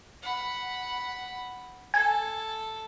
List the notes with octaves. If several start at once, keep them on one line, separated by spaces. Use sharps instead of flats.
F#5 B5
A4 G#5